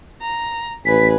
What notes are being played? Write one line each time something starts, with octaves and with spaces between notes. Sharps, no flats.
A#5
A1 B4 G#5 B6